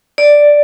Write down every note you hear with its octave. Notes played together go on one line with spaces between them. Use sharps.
D5